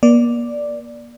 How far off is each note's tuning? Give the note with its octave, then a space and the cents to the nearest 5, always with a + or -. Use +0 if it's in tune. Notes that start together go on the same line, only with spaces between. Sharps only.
A#3 +40 D5 +0